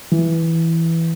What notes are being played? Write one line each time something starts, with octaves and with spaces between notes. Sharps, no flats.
E3